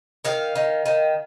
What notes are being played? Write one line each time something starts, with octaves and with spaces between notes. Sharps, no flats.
D#3 F5
D#3
D#3